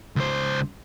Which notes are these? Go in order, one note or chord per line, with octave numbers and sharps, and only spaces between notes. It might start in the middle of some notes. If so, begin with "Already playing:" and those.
C#2 C5